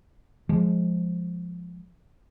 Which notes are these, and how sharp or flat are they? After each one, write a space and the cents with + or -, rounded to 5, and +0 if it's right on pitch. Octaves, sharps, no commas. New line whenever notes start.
F3 +5 G#3 +0